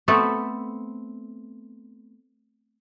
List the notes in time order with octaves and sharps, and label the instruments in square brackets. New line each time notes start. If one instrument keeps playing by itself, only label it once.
[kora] A3 B3 C4 A4